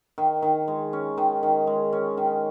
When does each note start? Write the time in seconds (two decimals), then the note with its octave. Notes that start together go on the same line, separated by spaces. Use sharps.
0.18 D#3
0.42 D#3
0.68 G#3
0.93 C#4
1.18 D#3
1.43 D#3
1.67 G#3
1.93 C#4
2.17 D#3